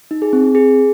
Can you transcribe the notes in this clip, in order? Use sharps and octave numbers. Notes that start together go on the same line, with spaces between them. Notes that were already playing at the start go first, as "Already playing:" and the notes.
D#4
G#4
C4
C4
G#4